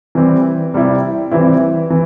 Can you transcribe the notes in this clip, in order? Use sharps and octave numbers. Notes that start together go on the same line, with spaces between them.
E3 G3 C4
C3 G3 C4 E4
E3 G3 C4 E4
E3